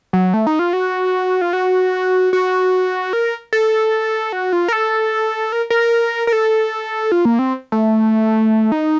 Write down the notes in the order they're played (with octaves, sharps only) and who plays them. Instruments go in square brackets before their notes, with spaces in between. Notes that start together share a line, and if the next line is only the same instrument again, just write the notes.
[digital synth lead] F#3
A3
D#4
F4
F#4
F4
F#4
F#4
A#4
A4
F#4
F4
A#4
A4
A#4
A#4
A#4
A4
F4
A#3
C4
A3
D#4